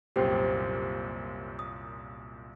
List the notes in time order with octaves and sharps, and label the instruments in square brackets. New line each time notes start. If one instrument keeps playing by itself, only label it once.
[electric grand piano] C2 F#2 A#2 [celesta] G4 C5 G5
[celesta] D#6